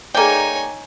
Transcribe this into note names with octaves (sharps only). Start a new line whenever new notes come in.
A#3 D#4 G#4 A4 C#5 D5 G5 G#5